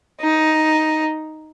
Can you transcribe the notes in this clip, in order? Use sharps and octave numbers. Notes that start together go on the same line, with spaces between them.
D#4